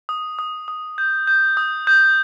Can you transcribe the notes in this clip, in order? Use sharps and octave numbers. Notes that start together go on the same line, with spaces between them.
D#6
D#6
D#6
G6
G6
D#6
D#6 G6